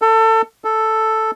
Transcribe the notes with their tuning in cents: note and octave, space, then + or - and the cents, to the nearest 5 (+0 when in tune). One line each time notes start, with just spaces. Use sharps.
A4 +25
A4 +0